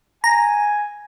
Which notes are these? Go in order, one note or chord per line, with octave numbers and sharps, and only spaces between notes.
G#5 A#5